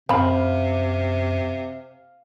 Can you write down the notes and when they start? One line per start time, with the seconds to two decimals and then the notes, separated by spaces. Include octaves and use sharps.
0.09 F#2 C3 C4 F5 B5